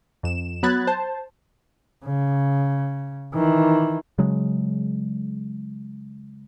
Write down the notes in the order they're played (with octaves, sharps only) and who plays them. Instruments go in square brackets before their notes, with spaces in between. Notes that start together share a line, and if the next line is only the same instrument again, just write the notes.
[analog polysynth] F2 E7
F#3 B3 B5 F#6 G#6 A6
C5 A5
[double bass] C#3
D#3 E3
[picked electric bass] C#3 F#3 G#3